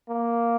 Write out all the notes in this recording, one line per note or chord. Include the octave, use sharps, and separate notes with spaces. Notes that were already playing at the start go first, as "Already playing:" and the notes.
A#3